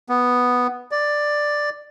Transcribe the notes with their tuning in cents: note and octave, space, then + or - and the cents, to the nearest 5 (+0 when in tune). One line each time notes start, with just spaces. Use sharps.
B3 +0
D5 +5